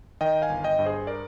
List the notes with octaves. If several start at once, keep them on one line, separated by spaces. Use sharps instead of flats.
D#3 D#5 G5
F5 G#5
G1
D#5 G5
G2
G#4 C5
A#4 D5